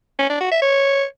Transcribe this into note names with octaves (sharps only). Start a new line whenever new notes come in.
C#4
D4
F#4
E5
C#5